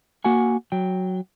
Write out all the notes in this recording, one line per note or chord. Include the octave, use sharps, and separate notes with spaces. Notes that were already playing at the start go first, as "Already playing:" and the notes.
A#3 F#4 F#5 G#5
F#3 G5